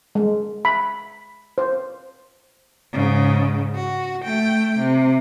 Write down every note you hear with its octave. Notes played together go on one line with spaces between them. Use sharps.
G#3
B5
C5
G#2 C#3
F#4
A3 G5
C3